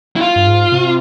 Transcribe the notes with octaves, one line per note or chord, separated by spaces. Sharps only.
E4
F4
G2
G#2
C3